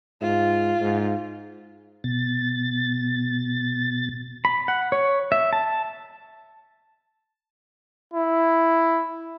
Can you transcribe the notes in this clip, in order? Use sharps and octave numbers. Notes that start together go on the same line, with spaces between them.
G#2 F4
G#2
B2 A6
B5
F#5
C#5
E5
A5
E4